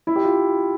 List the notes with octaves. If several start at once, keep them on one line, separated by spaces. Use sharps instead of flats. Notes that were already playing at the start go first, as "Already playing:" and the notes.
E4
G4
F4